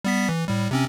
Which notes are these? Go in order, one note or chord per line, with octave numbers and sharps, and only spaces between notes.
G3 B3 B6
E3
A2 G3
C3 C4 C#4